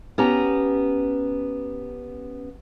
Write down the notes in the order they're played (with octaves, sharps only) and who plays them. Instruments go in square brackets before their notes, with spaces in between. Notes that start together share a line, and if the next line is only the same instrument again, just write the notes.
[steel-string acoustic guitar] B3 C#4 G4 A#5